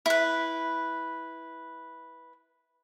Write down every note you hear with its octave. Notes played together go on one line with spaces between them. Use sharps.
E4 B4